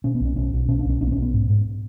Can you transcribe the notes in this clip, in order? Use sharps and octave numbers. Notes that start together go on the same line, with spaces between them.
B2 C#4
B3
B1 C#4
B1 C#4
B1
B2 C#4
D4
B1 C#4
B1 D4
B3
B1 C#4
B3
G#2
G#2